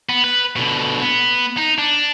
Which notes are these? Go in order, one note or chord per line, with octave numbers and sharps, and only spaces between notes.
B3
B4
B2 D3
B3
D#4
D4